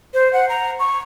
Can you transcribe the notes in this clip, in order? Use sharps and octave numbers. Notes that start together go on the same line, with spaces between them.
C5
F#5
A#5
C#6